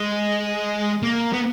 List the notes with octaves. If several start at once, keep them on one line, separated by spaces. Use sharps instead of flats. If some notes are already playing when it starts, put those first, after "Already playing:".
Already playing: G#3
A#3
B3